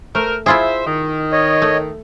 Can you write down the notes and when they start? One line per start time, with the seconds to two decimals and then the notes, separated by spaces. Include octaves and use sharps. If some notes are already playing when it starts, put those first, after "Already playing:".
0.15 A3 A#4 C5
0.46 E4 F4 G#4 C5 E5
0.87 D#3
1.32 C#5 D#5
1.62 A3